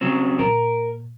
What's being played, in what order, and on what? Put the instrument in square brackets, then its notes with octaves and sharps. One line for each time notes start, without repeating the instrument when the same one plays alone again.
[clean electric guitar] C#3 F#3 C4
[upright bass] A#2 [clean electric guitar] A#4